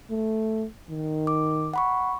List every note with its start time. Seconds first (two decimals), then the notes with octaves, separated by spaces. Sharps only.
0.10 A3
0.90 D#3
1.27 D6
1.74 F#5 B5 C#6